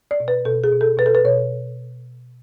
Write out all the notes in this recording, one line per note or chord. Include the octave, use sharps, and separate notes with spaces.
D5
B2
B4
B2 A4
G#4
B2
A4
B2 B4
A4
B4
B2 C#5